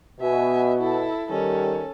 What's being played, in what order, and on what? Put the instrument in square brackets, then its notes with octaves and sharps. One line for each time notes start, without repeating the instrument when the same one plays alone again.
[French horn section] B2 [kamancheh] E5 G#5
[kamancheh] E4 A4
[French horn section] D#3 G3 [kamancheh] C#4 A4